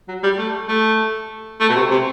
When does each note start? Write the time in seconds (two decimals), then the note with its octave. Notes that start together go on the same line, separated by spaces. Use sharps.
0.08 F#3
0.23 G3
0.38 A3
0.68 A3
1.60 A3
1.69 B2
1.76 C3
1.91 C3